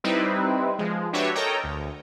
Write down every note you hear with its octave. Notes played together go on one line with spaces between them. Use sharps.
G3 C4 D#4 E4 B4
F3 G#3
D4 F#4 G4 B4 C#5 E5
A4 A#4 C#5 D#5 G5 A#5
D2